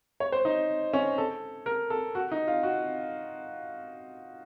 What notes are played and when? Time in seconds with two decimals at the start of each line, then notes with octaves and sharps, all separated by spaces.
0.20 C#5
0.32 C5
0.45 D#4
0.93 C#4
1.18 A4
1.66 A#4
1.90 A4
2.15 F#4
2.32 D#4
2.48 F4
2.63 F#4